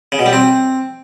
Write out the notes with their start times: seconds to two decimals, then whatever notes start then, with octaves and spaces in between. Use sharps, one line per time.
0.12 C#3
0.19 B2
0.26 G3
0.33 C4